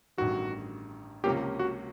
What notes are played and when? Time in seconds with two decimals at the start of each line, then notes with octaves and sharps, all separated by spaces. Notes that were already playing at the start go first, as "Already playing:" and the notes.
0.18 A1 G2 D#3 F#4
1.24 C#2 C3 F3 A#3 C#4 G4
1.59 F#4